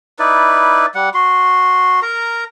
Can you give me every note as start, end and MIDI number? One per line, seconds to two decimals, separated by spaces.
0.19 0.86 63
0.19 0.86 64
0.19 0.86 71
0.19 0.86 74
0.95 1.09 55
0.95 1.09 78
1.14 2.00 66
1.14 2.00 84
2.02 2.44 70
2.02 2.44 82